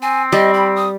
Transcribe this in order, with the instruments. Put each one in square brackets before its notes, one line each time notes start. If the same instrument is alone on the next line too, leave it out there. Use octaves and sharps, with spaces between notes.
[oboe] C4 [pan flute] G#5
[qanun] G3 [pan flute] D#5
[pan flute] B5
D#6